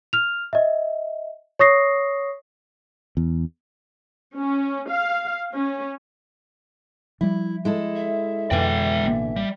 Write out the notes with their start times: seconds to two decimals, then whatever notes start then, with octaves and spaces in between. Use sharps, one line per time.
0.13 F6 F7
0.53 D#5 E5
1.59 C#5 C#6 D#6 A#6 C7
3.17 E2
4.38 C#4
4.90 F5
5.56 C#4
7.21 F3 G3 E4
7.65 G#3 E4 A4
7.96 E5
8.51 F2 B2 D3 E3 G#3 G5
9.04 A1 A#3
9.36 G3